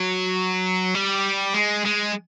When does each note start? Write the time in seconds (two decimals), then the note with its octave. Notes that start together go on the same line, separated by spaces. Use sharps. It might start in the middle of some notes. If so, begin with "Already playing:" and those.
Already playing: F#3
0.94 G3
1.54 G#3
1.85 G#3